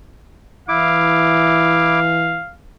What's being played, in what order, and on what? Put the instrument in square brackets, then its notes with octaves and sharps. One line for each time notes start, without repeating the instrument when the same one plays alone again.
[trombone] E3 [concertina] E4 D6 [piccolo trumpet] F5